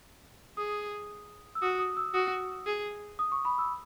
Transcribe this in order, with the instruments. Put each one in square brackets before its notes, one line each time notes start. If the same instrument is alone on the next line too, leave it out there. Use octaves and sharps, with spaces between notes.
[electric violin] G#4 [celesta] D#6
[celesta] E6
[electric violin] F#4 [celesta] D#6
[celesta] D#6
E6
[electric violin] F#4 [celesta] D#6
[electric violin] G#4
[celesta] D#6
C#6
B5
E6